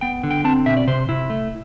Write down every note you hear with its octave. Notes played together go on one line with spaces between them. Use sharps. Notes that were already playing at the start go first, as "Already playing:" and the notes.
B3 G5
D3
G5
C4 A5
B2 E5
D5
C3 C5
C3 E4
A3